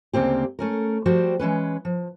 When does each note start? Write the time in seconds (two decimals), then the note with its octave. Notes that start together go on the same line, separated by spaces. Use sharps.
0.13 D2 C#3 A#3 C4 G4
0.59 A3 C#4 A#4
1.06 F3 G3 F#4 C5 G5
1.39 E3 G#3 C#4 B4
1.85 F3